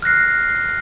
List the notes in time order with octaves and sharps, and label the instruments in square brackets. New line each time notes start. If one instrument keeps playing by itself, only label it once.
[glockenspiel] F6 F#6 A#6 C7